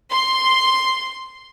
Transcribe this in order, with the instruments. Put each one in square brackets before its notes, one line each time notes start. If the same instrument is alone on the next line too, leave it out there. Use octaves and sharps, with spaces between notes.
[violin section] C6